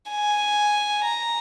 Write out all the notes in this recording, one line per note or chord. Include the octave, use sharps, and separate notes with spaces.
G#5
A#5